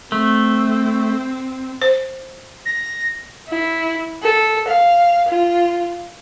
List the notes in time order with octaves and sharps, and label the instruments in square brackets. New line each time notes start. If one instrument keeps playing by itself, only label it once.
[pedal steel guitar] A3 [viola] C4
[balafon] C5
[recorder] A#6
[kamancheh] E4
A4
F5
F4